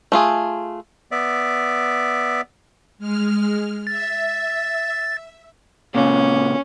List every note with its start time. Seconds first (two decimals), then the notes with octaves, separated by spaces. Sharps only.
0.12 A3 F4 G#4
1.11 B3 D5 E5
2.98 G#3 F6
3.87 E5 A6
5.95 A#2 C#3 C#4